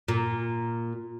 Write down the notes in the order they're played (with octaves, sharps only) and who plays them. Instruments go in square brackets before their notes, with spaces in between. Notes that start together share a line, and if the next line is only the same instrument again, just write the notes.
[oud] A#2